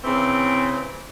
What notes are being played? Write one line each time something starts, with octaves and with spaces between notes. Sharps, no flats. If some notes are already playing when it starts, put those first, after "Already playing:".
C#3 E3 C4